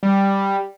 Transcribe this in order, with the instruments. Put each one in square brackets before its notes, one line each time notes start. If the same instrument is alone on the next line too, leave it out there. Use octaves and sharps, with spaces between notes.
[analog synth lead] G3